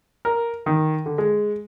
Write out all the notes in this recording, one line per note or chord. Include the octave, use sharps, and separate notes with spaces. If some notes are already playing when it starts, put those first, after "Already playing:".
A#4
D#3
D3
G#3